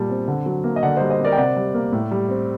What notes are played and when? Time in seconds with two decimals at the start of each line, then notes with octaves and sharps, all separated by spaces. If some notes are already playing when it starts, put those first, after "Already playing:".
Already playing: A#2 G3 A5
0.10 C4
0.28 D3
0.46 F#3
0.64 A#3
0.76 D#5
0.83 D3 D5 F#5
0.97 G3 C5 D#5
1.10 C5 D#5
1.20 C4 A#4 D5
1.32 G5
1.37 C3 D5 F#5
1.56 G3
1.74 A#3
1.92 A2
2.11 G3
2.29 C4